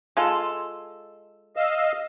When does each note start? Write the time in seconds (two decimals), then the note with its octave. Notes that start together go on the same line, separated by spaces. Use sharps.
0.17 G#3 F4 A4
1.56 D#5 F5 E6